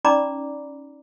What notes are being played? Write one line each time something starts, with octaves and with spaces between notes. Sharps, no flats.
C#4 D#4 D5 A#5 B5 D6